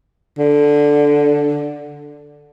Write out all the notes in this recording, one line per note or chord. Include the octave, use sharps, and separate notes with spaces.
D3